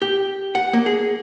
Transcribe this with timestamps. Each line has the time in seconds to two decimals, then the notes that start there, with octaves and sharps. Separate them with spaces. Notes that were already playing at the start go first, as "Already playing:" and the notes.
0.02 G4
0.55 F#5
0.73 A#3
0.86 G#4